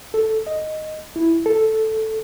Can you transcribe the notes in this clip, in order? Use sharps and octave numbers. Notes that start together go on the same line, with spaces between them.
A4
D#5
E4
A4